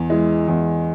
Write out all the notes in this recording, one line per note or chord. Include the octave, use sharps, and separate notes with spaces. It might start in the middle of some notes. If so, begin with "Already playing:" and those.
Already playing: E2
E3 G#3
E2